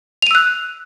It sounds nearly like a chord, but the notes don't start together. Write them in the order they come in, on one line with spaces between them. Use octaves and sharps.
F7 D#7 E6 F#6